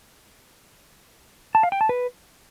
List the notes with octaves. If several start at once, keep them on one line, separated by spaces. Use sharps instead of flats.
A5
F5
G5
A5
B4